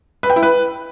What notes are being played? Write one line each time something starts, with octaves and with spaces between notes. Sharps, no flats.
B4
G5
E4
B4